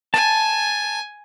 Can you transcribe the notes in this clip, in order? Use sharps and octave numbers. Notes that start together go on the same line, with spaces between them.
G#5 A5